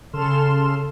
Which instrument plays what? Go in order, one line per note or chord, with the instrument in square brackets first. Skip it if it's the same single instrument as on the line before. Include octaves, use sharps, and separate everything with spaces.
[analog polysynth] C#3 A4 C6 F6 E7